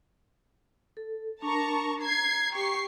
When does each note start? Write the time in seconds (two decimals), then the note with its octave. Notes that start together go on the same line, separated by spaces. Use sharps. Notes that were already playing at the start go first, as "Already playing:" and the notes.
0.97 A4
1.42 D4 A#4 A5 A#5 C#6
2.01 A#5 G#6 C7
2.52 G4 C#6 C7